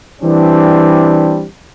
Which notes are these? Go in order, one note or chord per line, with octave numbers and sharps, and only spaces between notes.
E3 G3 C4 D4